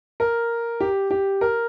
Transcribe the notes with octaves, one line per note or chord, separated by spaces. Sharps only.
A#4
G4
G4
A#4